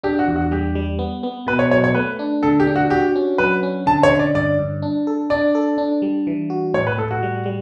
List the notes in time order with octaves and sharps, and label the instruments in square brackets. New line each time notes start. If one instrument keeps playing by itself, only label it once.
[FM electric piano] D4 [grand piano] G4
[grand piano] F#4
[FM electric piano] E2
[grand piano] F#4
[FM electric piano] G3 [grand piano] G4
[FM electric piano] G3
B3
B3
[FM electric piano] B2 [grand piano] B4
[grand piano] C#5
[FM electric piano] F#3 [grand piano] C#5
[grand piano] C#5
[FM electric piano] A3 [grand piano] B4
[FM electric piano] D4
[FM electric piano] D3 [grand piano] A4
[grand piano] G4
[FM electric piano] D4
[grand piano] F#4
[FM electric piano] F#4 [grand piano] G4
[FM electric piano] C#4
[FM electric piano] F#3 [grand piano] B4
[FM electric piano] C#4
[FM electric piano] D3 [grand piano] A5
[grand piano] C#5
[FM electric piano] D3
[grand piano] D5
[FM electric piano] G2 [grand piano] D5
[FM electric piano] G2
D4
A4
[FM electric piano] D4 [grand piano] D5
[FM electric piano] A4
D4
G3
E3
F#4
[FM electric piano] A2 [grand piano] C#5
[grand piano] B4
[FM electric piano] A2 [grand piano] A4
[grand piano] F#4
[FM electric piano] G3
G3